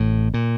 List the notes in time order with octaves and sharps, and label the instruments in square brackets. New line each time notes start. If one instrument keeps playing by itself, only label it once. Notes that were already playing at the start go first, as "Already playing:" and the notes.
Already playing: [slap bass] A1 A2
A#2